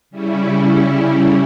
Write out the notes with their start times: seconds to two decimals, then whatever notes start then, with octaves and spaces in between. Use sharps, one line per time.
0.11 C#3 G3 C#4 E4